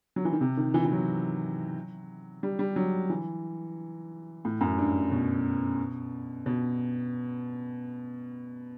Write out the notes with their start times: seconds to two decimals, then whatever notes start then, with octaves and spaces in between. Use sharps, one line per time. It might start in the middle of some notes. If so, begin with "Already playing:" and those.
0.16 F#3
0.25 E3
0.32 D#3
0.41 C3
0.57 D#3
0.74 E3
0.85 E3
0.92 F#3
2.43 G3
2.59 G3
2.76 F#3
3.10 E3
4.45 A2
4.61 F#2
4.78 G2
5.11 B2
6.46 B2